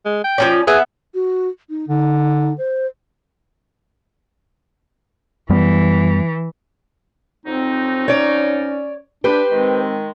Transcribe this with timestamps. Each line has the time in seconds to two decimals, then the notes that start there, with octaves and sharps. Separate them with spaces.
0.06 G#3
0.24 G5
0.38 F3 C#4 D5
0.67 B3 G#4 E5
1.14 F#4
1.69 D#4
1.88 D3 D#4
2.58 C5
5.50 F#2 E3 G3 B3
7.46 F2 F#3 C4 D#4
8.08 C#4 C#5 D5
9.24 D4 G4 B4 C5
9.52 D#3 G#3 C4